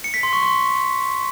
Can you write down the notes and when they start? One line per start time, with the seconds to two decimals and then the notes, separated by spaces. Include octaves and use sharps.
0.04 C#7
0.14 B6
0.23 C6
0.33 C#6
0.42 C6